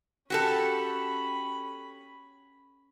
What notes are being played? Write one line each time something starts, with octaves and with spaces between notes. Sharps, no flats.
C#4 F#4 G4 A4 B5